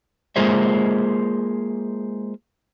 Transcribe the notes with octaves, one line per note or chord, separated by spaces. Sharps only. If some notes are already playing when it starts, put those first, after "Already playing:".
G#3 A#3 F4 G#4 C5 E5